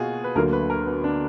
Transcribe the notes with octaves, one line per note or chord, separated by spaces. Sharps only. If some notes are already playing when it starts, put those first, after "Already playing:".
Already playing: B2 A#3 F4 F#4 G#4
B4
D2 D3 F#3 A#3 A#4
B4
A#4
B3
D4